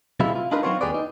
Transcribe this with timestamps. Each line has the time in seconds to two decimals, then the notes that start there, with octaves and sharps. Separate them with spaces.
0.20 C3 F#3 G#3 B3 E4 F4
0.35 F4
0.51 D4 D#4 F4 A#4 B4
0.63 F#3 C4 D#4 F4 F#4 C#5
0.81 D#2 C3 G4 G#4 B4 D5
0.94 D#4